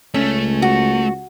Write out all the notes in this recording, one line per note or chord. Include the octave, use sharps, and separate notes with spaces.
C#2 A3 C#4
F#4